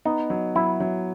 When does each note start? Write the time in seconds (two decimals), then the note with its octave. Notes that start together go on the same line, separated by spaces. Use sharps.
0.05 B3 D#4
0.30 F#3
0.56 F#3 E4
0.80 F#3